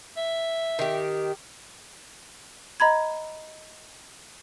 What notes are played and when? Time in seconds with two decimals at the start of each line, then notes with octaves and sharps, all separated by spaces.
0.17 E5
0.79 D#3 G4
2.80 D#5 A#5 B5 G#6